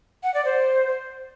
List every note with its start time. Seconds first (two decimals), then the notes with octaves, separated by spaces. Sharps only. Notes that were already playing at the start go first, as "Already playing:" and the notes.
0.23 F#5
0.34 D5
0.45 C5